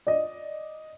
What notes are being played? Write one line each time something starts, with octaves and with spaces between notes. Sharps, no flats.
D5 D#5